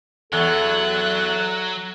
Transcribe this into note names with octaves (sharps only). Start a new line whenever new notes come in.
E2 F#3 A4 F#6